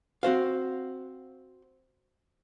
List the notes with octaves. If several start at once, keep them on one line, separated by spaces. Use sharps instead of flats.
C4 F#4 C5 F5